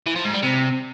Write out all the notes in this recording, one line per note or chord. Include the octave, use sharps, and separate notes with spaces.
E3
F3
G#2
G3
C3